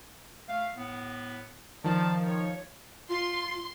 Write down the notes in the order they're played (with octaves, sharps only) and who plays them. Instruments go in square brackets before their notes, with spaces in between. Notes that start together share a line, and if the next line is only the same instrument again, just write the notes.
[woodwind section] A3 F5
A2 B3
[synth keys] D#3 F3 [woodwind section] D5 F5 A5
[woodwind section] C#5
[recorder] F4 [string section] C6